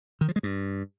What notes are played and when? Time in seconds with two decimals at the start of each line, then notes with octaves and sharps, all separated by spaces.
0.21 D#3
0.28 F3
0.36 G#3
0.43 G2